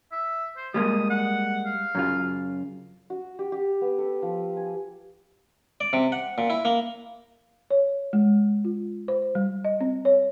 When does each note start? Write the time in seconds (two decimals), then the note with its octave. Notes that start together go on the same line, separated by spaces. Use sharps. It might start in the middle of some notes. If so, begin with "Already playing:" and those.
0.12 E5
0.57 C5
0.74 G3 G#3 A#3 D#6
1.10 F#5
1.65 F5
1.95 F#2 C#3 F4
3.10 F#4
3.39 G4
3.52 G4
3.81 B3
3.98 A4
4.23 F3
4.57 G#5
5.81 D5
5.93 C3
6.12 F#5
6.38 A#2
6.50 E4
6.65 A#3
7.71 C#5
8.13 G#3
8.65 F4
9.08 C5
9.35 G3
9.65 D#5
9.81 C4
10.05 C#5